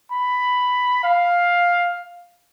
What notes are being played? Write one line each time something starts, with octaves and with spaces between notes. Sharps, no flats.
B5
F5